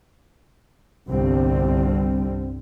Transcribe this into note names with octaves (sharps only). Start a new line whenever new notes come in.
G1 C2 D3 G3 C4